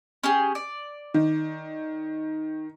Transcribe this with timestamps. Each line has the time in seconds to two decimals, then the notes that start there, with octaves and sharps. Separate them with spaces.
0.23 C#4 G4 G#4
0.55 D5
1.14 D#3